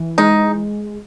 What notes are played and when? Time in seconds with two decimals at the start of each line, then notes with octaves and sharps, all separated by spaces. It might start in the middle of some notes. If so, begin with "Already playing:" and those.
Already playing: E3
0.18 G#3 D#4